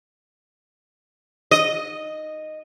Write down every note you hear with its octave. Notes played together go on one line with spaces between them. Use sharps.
D#5